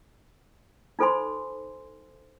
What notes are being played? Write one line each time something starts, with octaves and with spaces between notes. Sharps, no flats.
D#4 F4 A4 C5 G#5 C6